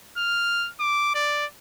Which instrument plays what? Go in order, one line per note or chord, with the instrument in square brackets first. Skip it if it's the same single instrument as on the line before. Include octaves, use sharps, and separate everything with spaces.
[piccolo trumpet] F6
D6
D5